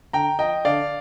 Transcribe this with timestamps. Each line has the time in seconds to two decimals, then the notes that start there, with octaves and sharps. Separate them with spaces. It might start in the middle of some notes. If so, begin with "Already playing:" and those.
0.13 D3 G5 A#5
0.39 F3 D#5 G5
0.65 D3 D5 F5